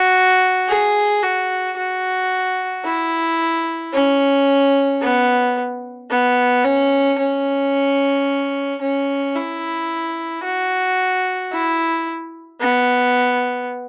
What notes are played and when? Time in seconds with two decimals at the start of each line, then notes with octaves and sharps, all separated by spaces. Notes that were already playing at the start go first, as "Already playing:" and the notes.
Already playing: F#4
0.68 G#4
1.22 F#4
1.77 F#4
2.85 E4
3.93 C#4
5.02 B3
6.10 B3
6.64 C#4
7.18 C#4
8.81 C#4
9.35 E4
10.44 F#4
11.52 E4
12.61 B3